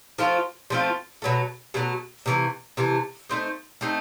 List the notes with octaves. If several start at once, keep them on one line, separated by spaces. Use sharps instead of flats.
F3 A3 C4 F4
F3 A3 C4 F4
B2 F#3 A3
B2 F#3 A3
C3 E3 A3
C3 E3 A3
A3 C4 D#4
A3 C4 D#4